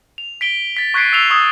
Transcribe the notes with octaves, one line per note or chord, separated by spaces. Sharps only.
F7
B6 D7 G7
A6 B6
C#6 F#6 G#6 B6 C7 D7
E6 C7 E7 F7 G7
C#6 D#6 G#6